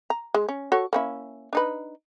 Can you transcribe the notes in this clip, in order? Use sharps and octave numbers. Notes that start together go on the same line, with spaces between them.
A#5
G#3
C#4
F#4 A4 C#5
A#3 C#4 E4
D4 D#4 B4